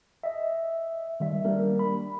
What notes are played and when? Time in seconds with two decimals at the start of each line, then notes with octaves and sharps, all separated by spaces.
0.23 D#5 E5
1.20 D#3 G3 E5
1.45 G3 A#3 D4 A#4
1.79 B5